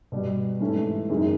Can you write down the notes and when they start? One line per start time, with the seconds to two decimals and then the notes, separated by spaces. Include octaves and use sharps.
0.12 B2 G3 B3
0.61 G#2 E3 A3 C#4 E4
1.10 F#1 F#2 D#3 G#3